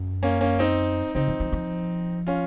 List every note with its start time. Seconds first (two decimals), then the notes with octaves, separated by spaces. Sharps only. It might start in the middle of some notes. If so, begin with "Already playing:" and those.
Already playing: F#2
0.23 A#3 C#4
0.41 A#3 C#4
0.59 C4 D#4
1.15 C#3 C4 D#4
1.28 F3
1.40 F3
1.52 F3
2.27 C#4 F4